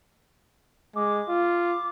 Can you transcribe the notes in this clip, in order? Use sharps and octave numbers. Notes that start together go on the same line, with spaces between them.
G#3 D6
F4